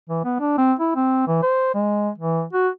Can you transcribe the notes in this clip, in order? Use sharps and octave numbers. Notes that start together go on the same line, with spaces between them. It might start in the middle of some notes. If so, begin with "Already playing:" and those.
E3
B3
D4
C4
E4
C4
E3
C5
G#3
E3
F#4